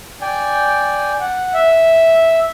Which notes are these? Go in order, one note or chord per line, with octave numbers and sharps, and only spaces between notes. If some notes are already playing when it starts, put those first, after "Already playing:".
D5 G5 G#5
F#5
E5